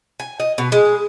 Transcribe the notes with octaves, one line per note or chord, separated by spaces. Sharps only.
G#5
D#5
B2
G#3